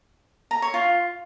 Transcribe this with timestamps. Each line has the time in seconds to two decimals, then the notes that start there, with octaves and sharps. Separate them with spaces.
0.51 A#5
0.62 C#5
0.74 F4